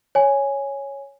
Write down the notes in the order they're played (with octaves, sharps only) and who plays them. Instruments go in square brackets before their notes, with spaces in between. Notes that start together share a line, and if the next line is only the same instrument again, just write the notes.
[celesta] C#5 G#5